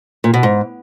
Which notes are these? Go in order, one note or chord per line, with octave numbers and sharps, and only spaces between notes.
A#2
B2
G#2